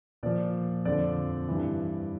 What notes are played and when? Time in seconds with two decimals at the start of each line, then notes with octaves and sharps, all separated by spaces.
0.23 A#2 F3 D5
0.85 F2 D3 F3 D5
1.48 G2 E3